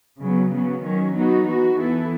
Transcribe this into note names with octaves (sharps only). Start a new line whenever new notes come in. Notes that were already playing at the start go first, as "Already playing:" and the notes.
C#3 F#3 B3
C#3 F#3 B3
D#3 F#3 C#4
F#3 B3 D#4 F#4
E3 B3 F#4
E3 B3 E4 A4